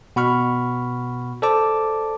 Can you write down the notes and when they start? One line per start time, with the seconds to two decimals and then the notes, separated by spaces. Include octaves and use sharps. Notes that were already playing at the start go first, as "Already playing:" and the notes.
0.16 B2 F#5 B5 C#6 F6
1.42 A4 C5 D5 A5 D6